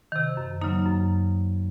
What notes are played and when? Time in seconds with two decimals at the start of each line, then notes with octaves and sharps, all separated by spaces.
0.12 C3 D#3
0.37 F#2
0.62 C#3 F#3 A#3 D#4
0.86 F#2